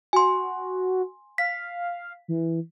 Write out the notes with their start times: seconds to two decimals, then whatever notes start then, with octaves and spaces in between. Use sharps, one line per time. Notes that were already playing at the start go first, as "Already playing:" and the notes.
0.13 F#4 G#5 C6
1.38 F5 B6
2.28 E3